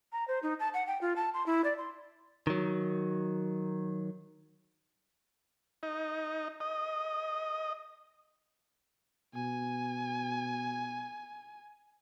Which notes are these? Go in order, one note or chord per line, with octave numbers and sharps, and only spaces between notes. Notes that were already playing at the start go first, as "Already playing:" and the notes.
A#5
C5
D#4
A5
F#5
G5
F4
A5
C6
E4
D5
C6
D#3 F#3
D#4
D#5
B2 G#5